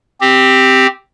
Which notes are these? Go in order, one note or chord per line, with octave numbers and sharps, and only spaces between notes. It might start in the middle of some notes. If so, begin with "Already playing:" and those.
C4 G4